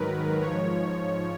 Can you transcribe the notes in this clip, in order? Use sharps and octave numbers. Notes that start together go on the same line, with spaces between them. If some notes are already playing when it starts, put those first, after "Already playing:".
Already playing: G#2 D#3 F#3 A#4 B4
G#2 F3 C#5